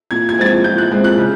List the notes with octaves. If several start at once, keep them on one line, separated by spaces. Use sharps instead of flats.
A#2 G#6
G#6
F3 G#3 C4 A6
G#6
A#2 G6
F#6
F3 G#3 C4
F#6
C#3